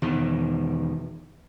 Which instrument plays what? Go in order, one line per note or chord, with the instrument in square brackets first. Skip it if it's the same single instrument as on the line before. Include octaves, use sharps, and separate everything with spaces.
[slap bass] E2 B2 D#3